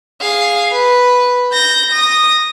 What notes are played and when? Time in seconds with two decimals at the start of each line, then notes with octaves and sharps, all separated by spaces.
0.21 G#4 F5
0.72 B4
1.52 G6 A#6
1.91 D#6 A#6